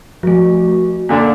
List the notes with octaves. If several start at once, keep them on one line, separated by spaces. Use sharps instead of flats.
F3 A3 F#4
A#2 D3 A#3 D4